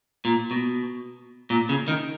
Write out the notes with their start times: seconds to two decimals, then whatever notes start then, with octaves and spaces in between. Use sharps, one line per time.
0.25 A#2
0.51 B2
1.50 A#2
1.69 C#3
1.88 D#3